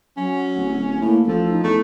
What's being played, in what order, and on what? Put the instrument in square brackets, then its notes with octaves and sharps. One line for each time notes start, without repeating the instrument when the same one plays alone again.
[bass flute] F#3 [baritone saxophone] C#4
[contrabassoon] D1
[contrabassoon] A2 [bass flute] A#3
[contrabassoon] A1 [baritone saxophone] F3 [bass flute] A4
[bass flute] D#4
[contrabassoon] E2 [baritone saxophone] A3